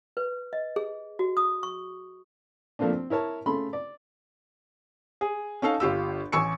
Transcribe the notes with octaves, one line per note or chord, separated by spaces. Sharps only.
B4
D#5
G#4
F#4
D#6
C#6
F3 A3 A#3 C4 D4
C4
E4 A#4 C#5 A5
C#3 A3 B5 C6
D5
G#4
C#4 D#4 A4 F5
G1 F4 G4 E6
A1 G#5 C#6 E6 C#7